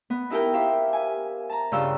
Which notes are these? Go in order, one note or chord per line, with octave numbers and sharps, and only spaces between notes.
B3
D#4 E4 G4 A#4 G5
G4 C5 E5 F5
G#5
A5 A#5
G2 C#3 F3 G4 F5 E6